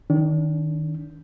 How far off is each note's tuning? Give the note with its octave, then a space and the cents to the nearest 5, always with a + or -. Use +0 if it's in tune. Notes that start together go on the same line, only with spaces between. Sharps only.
D#3 +0 D4 -40